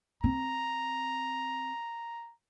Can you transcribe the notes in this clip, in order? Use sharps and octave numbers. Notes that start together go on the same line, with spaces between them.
C4 A#5